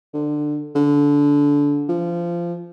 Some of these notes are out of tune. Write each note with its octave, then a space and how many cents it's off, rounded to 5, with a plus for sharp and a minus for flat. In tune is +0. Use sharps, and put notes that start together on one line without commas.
D3 +20
D3 -20
F3 -20